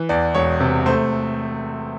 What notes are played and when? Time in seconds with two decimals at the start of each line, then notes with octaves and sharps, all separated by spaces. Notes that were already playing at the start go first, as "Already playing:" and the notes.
Already playing: E3
0.09 E2 D5
0.34 E1 C#5
0.60 C3
0.86 A3 C5